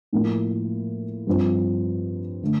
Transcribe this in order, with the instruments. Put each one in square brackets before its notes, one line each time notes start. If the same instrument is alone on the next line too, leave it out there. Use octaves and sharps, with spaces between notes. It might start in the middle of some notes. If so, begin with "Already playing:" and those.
[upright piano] A2 F3 A#3
G2 F3 C4
D3 A3